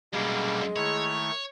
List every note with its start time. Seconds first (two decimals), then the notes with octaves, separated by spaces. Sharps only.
0.14 F#2 B2 D3 G3 G#3 A#3
0.76 D#3 A3 E4 C#5